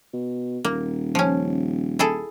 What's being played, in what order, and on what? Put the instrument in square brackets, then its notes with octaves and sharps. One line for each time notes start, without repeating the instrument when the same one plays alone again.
[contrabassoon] B2
[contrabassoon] D#1 [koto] A#3
[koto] F3 C#4
E4 G#4 A4